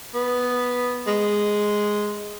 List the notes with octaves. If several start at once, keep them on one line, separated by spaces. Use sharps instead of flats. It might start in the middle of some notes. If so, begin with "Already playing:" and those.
B3
G#3